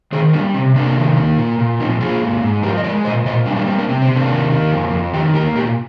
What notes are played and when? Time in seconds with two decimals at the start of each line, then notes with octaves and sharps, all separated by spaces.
0.12 D#3 G#4 C5
0.33 G3 A#3 D4
0.54 C3 C4
0.76 C3 A#3 D4
0.97 D#3
1.18 A#3
1.38 A#2
1.59 A#2
1.80 F3 C4 D#4
2.00 A#3 F4 G#4
2.21 G#2
2.43 G#2
2.63 F3 G4 A#4
2.77 D#5
2.84 G#3 A#4 D5
3.04 A#2 C5 D#5
3.26 A#2 C5 D#5
3.46 G3 D4 F4
3.56 A#3 D4
3.67 A#3 C4
3.78 A#3 D4
3.88 C3 C4
4.02 C4
4.09 C3
4.16 A#3 D4
4.30 D#3
4.51 A#3
4.71 F2
4.93 F2
5.13 D#3 D#4 G4
5.34 A#3 G4 A#4
5.55 A#2 G4 A#4